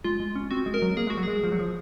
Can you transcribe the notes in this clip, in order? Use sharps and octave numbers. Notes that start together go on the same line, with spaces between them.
G#3 F4
G#3
C#4
C4 F#4
G#3
A#4
F#3
A#3 G#4
G#3 F#4
F#3
G#3 G#4
F3
F#3
F3